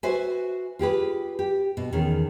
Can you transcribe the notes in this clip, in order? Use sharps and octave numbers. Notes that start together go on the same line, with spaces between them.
F#4 B4 C5 E5 G#5
F4 G4 G#4 B4
G4
B2
E2 D#3 C#4 G#4